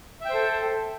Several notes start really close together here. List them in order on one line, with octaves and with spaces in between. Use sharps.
E5 G5 C5 A4